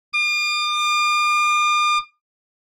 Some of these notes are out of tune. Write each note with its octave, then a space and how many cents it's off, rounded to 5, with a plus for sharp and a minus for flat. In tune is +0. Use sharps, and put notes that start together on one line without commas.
D6 +45